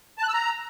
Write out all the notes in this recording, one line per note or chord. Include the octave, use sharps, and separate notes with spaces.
A5
F#6
E6
A#5